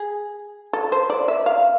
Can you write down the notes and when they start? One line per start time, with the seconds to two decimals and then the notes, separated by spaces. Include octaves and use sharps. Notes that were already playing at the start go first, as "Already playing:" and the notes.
Already playing: G#4
0.73 A4
0.92 C5
1.10 D5
1.28 E5
1.46 F5